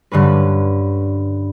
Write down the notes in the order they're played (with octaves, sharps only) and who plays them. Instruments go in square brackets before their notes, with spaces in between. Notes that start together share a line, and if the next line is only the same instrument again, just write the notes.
[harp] G2 D3 C#4 B4